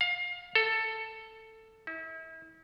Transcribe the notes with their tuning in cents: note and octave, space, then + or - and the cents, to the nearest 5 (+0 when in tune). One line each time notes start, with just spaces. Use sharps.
F5 +25
A4 +10
E4 -35